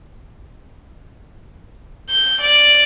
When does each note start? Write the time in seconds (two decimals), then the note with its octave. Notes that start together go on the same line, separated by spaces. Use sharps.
2.10 G6
2.41 D5